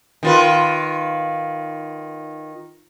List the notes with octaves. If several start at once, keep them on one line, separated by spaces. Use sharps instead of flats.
D#3 F4 B4